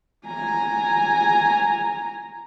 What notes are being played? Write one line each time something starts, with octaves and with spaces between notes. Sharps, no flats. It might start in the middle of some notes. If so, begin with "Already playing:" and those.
G#5 A#5